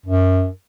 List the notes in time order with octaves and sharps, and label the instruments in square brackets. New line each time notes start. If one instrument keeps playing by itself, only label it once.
[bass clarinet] F#2